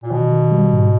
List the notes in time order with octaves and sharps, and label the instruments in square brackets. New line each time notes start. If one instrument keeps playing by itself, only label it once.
[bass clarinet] A#2
[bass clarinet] B2 [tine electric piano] D#3
[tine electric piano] D#3
G3
G#2